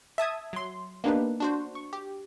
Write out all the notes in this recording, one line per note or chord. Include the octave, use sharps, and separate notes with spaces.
E5 A5 D#6 G#6
F#3 C6
A#3 B3 D4 D#4 G4 B4
D4 F#4 C5
C#6
G4